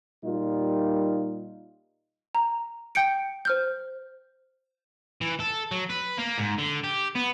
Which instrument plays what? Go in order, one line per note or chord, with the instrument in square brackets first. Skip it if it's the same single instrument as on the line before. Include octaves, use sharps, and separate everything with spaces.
[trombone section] A#2 G3 D#4 F4
[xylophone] A#5
G5 G6 C#7 D7
C5 F6 G6
[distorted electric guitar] E3
A4
F#3
B4
A#3
G#2
D3
G4
B3